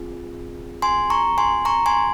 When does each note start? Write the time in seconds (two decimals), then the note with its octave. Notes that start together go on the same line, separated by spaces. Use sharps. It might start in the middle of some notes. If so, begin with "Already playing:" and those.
Already playing: C4 F4 G#4
0.82 G#5 C6
1.10 A#5 C#6
1.38 G#5 C6
1.65 A#5 C#6
1.86 G#5 C6